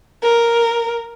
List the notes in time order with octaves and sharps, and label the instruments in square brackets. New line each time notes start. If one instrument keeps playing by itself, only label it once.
[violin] A#4